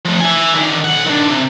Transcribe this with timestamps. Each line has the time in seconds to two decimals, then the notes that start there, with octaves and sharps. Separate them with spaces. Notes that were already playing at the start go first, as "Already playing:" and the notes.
0.05 F3 A3
0.20 E5 G#5
0.54 D3 D#3
0.85 B1 F#5
1.06 D#3 D4
1.30 C3